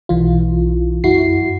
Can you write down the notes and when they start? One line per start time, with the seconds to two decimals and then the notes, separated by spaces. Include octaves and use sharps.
0.09 B1 E3 F4
1.04 F#2 E4 F#4 C7